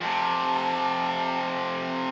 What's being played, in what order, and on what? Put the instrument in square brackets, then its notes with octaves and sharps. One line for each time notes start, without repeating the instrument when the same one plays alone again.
[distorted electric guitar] F2 C3 [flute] A5